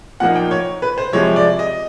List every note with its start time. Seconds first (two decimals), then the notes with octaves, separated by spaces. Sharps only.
0.20 A#2 F3 A#3 D#4 F#5
0.35 G5
0.51 C#5
0.82 B4
0.98 C5
1.13 C3 F3 G#3 C#5
1.36 D5
1.59 D#5